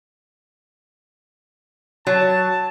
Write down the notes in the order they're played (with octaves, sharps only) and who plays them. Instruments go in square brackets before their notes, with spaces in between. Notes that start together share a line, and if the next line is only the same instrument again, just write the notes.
[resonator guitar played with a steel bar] F#3 [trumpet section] A5